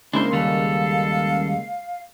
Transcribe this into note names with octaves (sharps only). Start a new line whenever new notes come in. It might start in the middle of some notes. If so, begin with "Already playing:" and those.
C#3 G#3 A#3 D4 E4 C5 B5 C6
D#2 G3 A4 F5